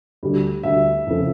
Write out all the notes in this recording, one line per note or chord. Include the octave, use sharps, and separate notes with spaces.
D2 D3 G3
D2 D3 G3 E5
F1 F2 C#3 F3 A3